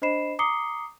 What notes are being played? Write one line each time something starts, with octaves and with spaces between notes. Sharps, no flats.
D4 C5 D#5 B5 C7 E7
A#5 D6 D#6 C7 C#7 G7